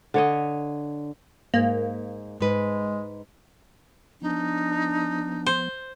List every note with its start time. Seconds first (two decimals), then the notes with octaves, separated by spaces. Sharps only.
0.14 D3 C#5 D#5
1.54 G#2 A#3
2.40 G#2 G#3 B4
4.22 F3 B3 D4 D#4
5.46 C5